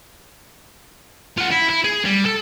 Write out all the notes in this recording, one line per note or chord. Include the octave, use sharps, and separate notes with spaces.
F4 F#5
E4
E4
G#4
G3
A4